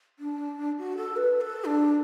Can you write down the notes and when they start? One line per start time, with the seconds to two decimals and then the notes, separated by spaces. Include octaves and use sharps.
0.19 D4
0.78 F#4
0.97 A4
1.16 B4
1.36 B4
1.41 A4
1.65 D4